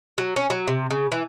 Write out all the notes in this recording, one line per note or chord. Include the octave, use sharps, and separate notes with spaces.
F#3
C#4
F#3
C3
C#3
E3